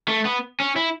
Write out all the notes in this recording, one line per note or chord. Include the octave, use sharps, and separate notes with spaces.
A3
B3
C#4
E4